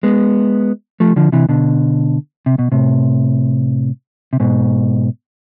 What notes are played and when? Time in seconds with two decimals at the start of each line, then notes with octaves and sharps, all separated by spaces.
0.03 G#3 B3
1.00 F3 A3
1.16 D3 F3
1.32 C3 E3
1.49 B2 D3
2.46 C3
2.59 B2
2.72 A2 C3
4.33 C3
4.40 G#2 B2